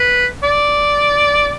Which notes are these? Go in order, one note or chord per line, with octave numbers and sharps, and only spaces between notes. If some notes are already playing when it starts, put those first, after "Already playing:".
Already playing: B4
D5